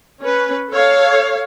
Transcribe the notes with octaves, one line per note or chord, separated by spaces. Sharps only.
C#4 B4
A4 C#5 F5